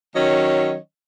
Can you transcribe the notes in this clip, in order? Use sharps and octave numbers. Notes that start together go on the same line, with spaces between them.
D#3 F#3 C#4 C#5 D#5